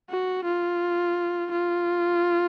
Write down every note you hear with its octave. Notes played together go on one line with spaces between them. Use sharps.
F#4
F4
F4